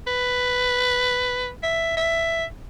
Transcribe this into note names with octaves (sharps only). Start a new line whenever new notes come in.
B4
E5
E5